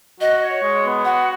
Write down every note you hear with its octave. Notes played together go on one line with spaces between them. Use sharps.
F#4 D#5
C#5
G#3
B3
F#4 F#5